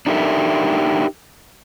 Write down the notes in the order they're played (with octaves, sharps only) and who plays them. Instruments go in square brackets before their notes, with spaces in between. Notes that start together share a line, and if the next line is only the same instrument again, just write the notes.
[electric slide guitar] D4 D#4 G4 A4 A#4 E5